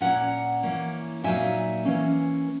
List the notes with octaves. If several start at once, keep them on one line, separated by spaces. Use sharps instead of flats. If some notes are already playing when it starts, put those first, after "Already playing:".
A#2 A#3 C#4 F#5 A#5
E3 A#3 C#4
A#2 F#3 A#3 D#4 E5 G#5
E3 A#3 C#4